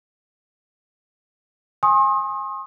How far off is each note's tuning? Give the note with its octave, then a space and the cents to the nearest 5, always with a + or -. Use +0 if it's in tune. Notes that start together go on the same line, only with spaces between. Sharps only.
G#5 -5 C6 +40 D#6 +10